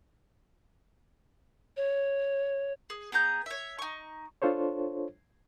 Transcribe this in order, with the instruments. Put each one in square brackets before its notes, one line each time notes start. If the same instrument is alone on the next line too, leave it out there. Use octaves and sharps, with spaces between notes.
[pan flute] C#5
[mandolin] G#4
B3 G#4 A#5 G6
C#5 E5
D#4 C#6
[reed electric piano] D4 F4 A4 C5 C#5